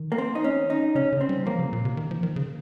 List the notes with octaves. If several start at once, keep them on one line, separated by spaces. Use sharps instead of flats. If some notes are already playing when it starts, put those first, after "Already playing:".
Already playing: D#3
A#3
C4
D#4
C#4
D#4
C#3 C#4
C#3
C4
G3
F3 A#3
C#3
A#2
C3
D#3
F3
D#3
C#3